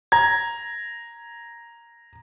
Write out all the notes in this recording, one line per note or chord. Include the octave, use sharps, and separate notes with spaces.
A#5 G#6